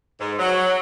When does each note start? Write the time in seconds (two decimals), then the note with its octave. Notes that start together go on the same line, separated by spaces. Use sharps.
0.20 G#2
0.39 F#3